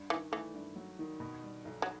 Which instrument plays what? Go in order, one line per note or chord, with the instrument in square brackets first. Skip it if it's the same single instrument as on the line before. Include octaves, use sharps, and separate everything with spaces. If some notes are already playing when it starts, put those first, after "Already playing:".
Already playing: [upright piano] G2
[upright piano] D#3 [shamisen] E3
[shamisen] E3 [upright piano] A3
[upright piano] G2
F#3
D#3
B2
G3
B1
[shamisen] F#3